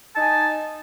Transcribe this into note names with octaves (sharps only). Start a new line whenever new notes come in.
D#4 G#5 A5